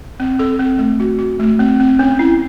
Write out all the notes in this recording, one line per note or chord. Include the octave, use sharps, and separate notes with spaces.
C4
A4
C4
A3
F#4
F#4
A3
C4
C4
C#4
E4